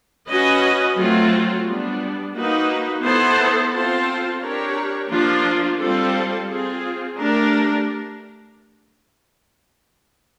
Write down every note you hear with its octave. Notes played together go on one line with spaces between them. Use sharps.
C#4 F#4 B4 D#5
F#3 A3 C4 F4
G3 B3 D4
A#3 D#4 F#4 B4
B3 E4 A4 C5
C4 F4 A4 C5
D4 G4 A#4 C#5
F3 A#3 D4 F4
G3 C4 F4 A4
C4 F4 G#4
A3 D4 G4 A#4